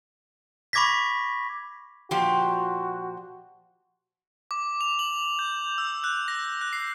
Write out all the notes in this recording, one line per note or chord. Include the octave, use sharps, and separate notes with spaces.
B5 C#6 D6 G#6 A#6 B6
A#2 F3 F#4 G4
D6
F7
F#7
G6
E6
F#6
A#6
F#6
C7